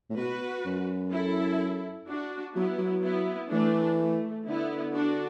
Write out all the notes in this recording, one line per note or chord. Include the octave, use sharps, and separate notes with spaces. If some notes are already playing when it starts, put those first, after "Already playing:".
A2
B2 F#4 B4
F#2
E4 A4
D4 F#4
F#3 B3 E4
F#3
B3 E4
E3 A3 D4
A3
D3 B3 E4
D4 F#4